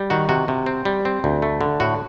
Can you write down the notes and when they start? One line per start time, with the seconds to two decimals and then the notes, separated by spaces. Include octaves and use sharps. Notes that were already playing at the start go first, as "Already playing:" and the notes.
Already playing: G3
0.10 D#3 F#4
0.29 C3 F#4
0.48 C3
0.66 C4
0.85 G3
1.05 C4
1.24 D2
1.42 A3
1.61 D3
1.80 A2 F#4